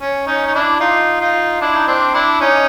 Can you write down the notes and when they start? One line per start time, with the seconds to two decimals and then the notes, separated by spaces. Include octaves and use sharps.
0.01 C#4
0.27 C#4 D#4
0.46 D#4
0.54 D4 E4
0.80 D#4 F4
1.20 D#4 F4
1.61 D4 E4
1.75 D#4
1.87 C4 D4
2.14 D4 E4
2.40 C#4 D#4